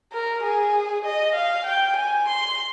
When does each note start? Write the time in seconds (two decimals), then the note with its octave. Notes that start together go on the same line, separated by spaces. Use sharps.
0.13 A#4
0.43 G#4
1.05 D#5
1.35 F5
1.67 G5
1.96 G#5
2.28 C6